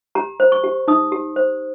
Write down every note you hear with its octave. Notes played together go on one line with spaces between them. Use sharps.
G4 A#5
C5
C#6
G4
D#4 D#6
G4
C5